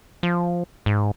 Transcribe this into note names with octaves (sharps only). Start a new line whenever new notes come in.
F3
G#2